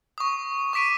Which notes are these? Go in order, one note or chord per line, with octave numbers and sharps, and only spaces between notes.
C#6 D#6
C#6 D6 B6 D7 D#7